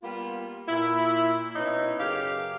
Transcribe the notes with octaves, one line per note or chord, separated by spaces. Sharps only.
G3 A#3 B3 F4
A#2 E4
B2 C#4 D#4 E4
F#2 C#3 G4 F5